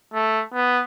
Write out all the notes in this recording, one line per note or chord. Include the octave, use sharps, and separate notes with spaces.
A3
B3